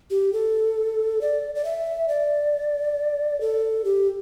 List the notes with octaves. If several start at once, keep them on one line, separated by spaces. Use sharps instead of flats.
G4
A4
D5
D5
E5
D5
A4
G4